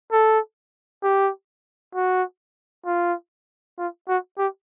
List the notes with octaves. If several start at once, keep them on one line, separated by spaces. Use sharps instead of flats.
A4
G4
F#4
F4
F4
F#4
G4